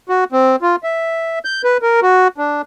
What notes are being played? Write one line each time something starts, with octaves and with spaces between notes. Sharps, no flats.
F#4
C4
F4
E5
G6
B4
A#4
F#4
D4